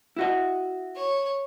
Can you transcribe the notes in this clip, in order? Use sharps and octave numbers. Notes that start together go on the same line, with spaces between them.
E4 F#4 D#5
C#5